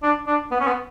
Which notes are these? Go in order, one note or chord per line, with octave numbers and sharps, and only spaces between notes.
D4
D4
B3
C#4
B3